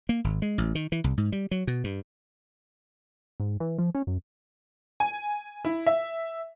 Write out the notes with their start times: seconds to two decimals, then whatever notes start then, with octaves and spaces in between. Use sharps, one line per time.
0.09 A#3
0.24 G#1
0.42 G#3
0.58 A1
0.75 D#3
0.92 E3
1.04 C2
1.18 G#2
1.32 G3
1.51 F#3
1.67 B2
1.84 G2
3.40 G#2
3.60 E3
3.78 F3
3.95 C#4
4.07 F#2
5.00 G#5
5.65 E4
5.86 E5